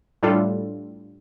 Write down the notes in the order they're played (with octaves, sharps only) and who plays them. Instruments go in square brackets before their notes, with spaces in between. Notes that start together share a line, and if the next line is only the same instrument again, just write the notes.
[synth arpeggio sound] A2 G3 D4 F4 A4